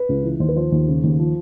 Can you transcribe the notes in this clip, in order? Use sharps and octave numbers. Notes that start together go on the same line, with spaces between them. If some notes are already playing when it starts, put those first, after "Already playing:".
Already playing: B4
C#2
E3
D#2 C5
B4
F3 C5
D#2
C#3
D#2
F3